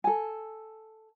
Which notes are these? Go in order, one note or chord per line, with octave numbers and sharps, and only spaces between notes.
A4 G#5